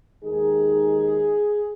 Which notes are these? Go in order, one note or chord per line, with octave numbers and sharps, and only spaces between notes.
D#2 D#3 G#3 D#4 G#4